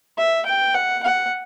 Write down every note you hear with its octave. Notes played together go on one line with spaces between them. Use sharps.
E5
G5
F#5
F#5